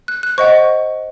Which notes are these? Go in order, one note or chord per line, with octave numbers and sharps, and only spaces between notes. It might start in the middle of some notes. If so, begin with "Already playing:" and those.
F#6
F#6
C5 D#5 F#5 C#6